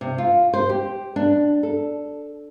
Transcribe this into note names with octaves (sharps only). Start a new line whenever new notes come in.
C3
F4
C5
G4
D4
A4